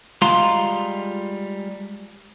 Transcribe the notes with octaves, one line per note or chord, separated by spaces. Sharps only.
G3 G#3 F4 F5 A#5 C6